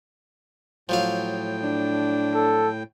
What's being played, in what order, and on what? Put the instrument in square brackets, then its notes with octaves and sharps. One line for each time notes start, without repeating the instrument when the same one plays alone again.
[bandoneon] A2 G5 [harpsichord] F3 F#3 F5
[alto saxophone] D4
[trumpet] A4